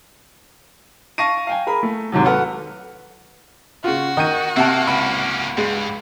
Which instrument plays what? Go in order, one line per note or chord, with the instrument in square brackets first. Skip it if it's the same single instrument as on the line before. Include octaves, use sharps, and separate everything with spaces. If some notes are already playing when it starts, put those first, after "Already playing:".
[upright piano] F5 A5 C#6 A#6 D#7
F5 G5 G#5
G#4 A#4 B5
A3
D#2 G#2 C3 F#3
F#4 A4 B4 F#5 F6
[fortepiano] C#3 F4 [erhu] F#4
[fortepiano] D#3 [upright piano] D#5 G6 D#7
[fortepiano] C3 A5 [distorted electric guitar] A#3 [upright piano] E5 F#5
[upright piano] C#2 E4 B5 [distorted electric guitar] A#3 C#4
[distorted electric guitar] G2 [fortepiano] G#3